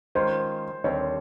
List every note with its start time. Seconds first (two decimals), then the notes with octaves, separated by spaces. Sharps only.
0.15 D#3 G#3 C#4 F4 C5
0.84 D#2 D3 G3 C4 C#5